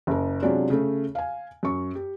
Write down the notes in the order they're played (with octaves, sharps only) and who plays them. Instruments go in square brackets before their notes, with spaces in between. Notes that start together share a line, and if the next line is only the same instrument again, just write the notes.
[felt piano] F#1 A#4
C3 F#3 G#3 C#4 D4 F4
C#3 A3
F5 G#5
F#2 C#6
G4